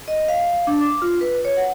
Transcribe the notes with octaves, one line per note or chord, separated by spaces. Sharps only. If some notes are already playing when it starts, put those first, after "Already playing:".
D#5
F5
D4
D6
F4
B4
C#5
F#5